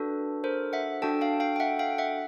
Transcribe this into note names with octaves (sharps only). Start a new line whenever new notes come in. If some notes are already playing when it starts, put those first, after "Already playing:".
Already playing: D4 F#4 A4 B4
A#4 C5
E5 F#5
D4 F#4 A4 G5 A5
F5 G5
F5 G5
G5
E5 F#5
F5 G5
E5 F#5